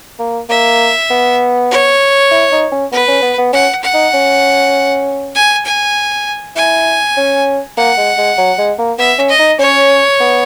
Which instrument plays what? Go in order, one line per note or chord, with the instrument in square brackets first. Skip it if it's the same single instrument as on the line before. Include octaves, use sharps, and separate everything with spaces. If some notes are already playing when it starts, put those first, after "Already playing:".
[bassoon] A#3
[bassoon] A#3 [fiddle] E5
[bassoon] B3
[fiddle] C#5
[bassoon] E4
D#4
C#4
[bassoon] B3 [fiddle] B4
[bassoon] C#4
B3
B3
[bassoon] C#4 [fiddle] F#5
[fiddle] F#5
[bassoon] D#4
C#4
[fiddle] G#5
G#5
[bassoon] E4 [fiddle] G#5
[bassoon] C#4
[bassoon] A#3 [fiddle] F#5
[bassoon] G#3
G#3
F#3
G#3
A#3
[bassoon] B3 [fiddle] E5
[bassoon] C#4
[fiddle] D#5
[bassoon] D#4
[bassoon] C#4 [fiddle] C#5
[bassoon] B3